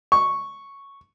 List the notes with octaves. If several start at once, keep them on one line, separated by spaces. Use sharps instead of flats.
C#6